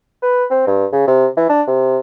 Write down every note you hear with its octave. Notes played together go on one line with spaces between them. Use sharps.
B4
C4
G2
C#3
C3
E3
D4
C3